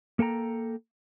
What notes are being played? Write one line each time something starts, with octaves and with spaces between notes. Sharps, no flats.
A#3 A4 G5 A#5